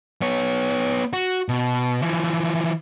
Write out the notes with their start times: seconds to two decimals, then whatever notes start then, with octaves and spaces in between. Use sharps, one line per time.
0.22 B3 C#5
1.13 F#4
1.49 B2
2.02 E3 F3